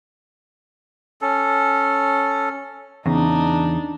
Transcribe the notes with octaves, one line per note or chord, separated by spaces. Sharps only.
C#4 A4
E2 C#3 D4 D#4